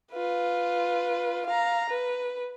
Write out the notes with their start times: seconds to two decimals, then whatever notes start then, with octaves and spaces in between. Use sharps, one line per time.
0.12 F4 B4
1.46 F5 A#5
1.90 B4